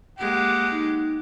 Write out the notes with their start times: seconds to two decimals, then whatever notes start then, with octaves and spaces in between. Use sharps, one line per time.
0.19 G#3 A#3 G4 F#5
0.71 D#4